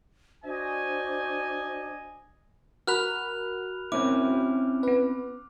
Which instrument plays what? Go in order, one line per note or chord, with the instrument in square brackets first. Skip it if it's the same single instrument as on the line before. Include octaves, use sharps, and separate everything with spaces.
[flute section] D4 F#4 C5 [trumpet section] D#5 G#5
[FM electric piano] F#4 A#4 B5 [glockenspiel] F6 F#6 F7
[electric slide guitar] C4 C#4 E4 [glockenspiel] D6
[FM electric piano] B3 B4